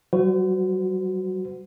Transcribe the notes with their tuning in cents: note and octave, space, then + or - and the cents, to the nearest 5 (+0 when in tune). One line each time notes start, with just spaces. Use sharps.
G3 -45 F#4 +0 C5 -45